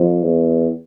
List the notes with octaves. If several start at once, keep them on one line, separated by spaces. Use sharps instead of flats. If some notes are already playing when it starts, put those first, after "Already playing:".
Already playing: F2
E2